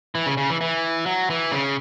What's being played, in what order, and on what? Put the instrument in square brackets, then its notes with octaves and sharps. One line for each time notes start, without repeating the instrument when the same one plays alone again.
[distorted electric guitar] E3
C#3
C#3
E3
E3
F#3
E3
C#3